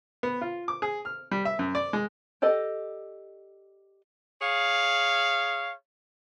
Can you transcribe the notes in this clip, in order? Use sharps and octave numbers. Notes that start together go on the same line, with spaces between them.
B3
F4
D6
G#4
F6
G3
E5
F#2
D5
G#3
G4 A4 D5 D#5
G#4 C#5 F5